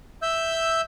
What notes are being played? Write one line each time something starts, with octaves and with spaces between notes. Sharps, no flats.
E5 E6 G6